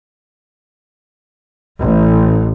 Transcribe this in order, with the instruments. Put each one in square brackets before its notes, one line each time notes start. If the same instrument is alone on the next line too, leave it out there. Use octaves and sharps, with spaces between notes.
[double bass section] A1